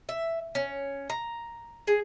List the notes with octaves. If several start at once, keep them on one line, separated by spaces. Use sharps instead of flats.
E5
C#4
A#5
G#4